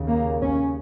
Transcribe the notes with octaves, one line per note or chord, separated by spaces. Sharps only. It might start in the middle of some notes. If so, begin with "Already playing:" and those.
Already playing: D#2 C#3
A#3
C#4